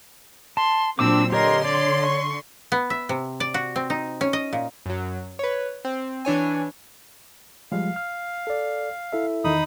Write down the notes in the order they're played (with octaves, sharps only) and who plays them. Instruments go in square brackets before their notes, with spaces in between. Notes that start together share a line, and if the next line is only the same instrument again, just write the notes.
[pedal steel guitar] A5 [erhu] C6
[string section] A#2 F#3 C4 [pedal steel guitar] D4 D6 [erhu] E6
[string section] D3 C6 [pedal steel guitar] G4 C#5 D#5 [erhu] A#4
[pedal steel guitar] C#5 [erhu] D5
[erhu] C#6
[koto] B3
E5
C3
D5
F#4
C4
D#4
C#4
D#5
A#2
[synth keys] F#2 F#3
B4 C#5
C4
E3 D4 C#5 G#5
[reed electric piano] F3 G3 G#3 [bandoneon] F5
[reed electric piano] F6
[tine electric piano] A4 D5
E4 A4 E5
[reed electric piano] E2 D#3 [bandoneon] D#4 B5 D#6